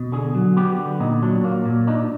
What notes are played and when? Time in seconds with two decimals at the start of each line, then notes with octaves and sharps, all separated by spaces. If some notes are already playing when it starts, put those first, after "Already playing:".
Already playing: B2
0.12 D3 G#4
0.35 F#3
0.57 B3 G4
0.78 D3
1.00 A#2 D#4
1.22 F#3 D4
1.44 A#3
1.66 A#2
1.87 D4 D#4